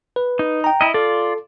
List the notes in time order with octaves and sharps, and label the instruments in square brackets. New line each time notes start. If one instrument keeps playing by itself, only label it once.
[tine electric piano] B4
[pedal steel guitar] D#4
[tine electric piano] G5 A#5
[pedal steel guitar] E4 D#5
[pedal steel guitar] F4 D5 [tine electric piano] A4